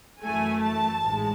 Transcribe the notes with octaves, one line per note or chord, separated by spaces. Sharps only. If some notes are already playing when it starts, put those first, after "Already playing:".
F#2 E3 A3 G#5
A5
A1 G#2 G#3